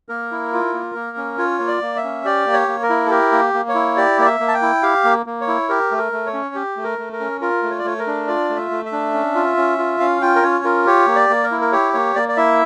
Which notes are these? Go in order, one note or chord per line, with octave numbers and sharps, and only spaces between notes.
A#3 A#4
E4
F4
A#3
A#3
C#4
F4 C#5
A#3
D5
A#3
E5
C#4
G4 D5
A#3
C#5
A#3
A#4
E4
A4
G4 A#4
A#3
A#3
C#5
E4
G4 D5
A#3 D5
E5
A#3
A5
G5
E4
G4 F5
A#3
A#3
C#5
E4
G4 A#4
A3
A#4
A3
C#5
C#4
G4
A3
A#4
A3
A#4
C#4
F4 A#4
A3
C#5
D5
A3 C#5
A#4
D4
F4 D5
A3
E5
A3
E5
D4
C#4
F4
C#4
F4
C#4 F5
F4 G5
A#4
C#4 C#5
F4 A#4
G4 C#5
A#3
D5
A#3
A#4
E4
A#4
G4 C#5
A#3 C#5
A#3 D5
D5
E4 E5